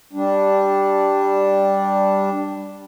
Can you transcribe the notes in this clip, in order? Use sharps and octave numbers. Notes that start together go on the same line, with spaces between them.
G3 D4